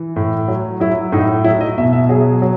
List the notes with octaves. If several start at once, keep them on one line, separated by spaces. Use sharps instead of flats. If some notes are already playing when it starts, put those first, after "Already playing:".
Already playing: E3
A2
F#3
F#3 E4
A2 D#4
F#3 E4
D#5
B2 E5
E5
F#3 G#4
F#3